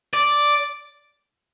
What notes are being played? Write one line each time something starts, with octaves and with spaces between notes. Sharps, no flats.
D5